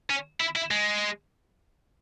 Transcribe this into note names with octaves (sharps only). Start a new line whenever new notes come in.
C#4
E4
E4
G#3